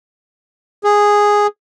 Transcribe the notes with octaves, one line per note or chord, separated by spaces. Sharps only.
G#4